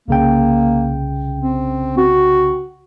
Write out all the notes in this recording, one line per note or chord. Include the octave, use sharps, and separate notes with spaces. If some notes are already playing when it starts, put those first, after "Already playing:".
C2 C#3 A#3 G5
C4
F#4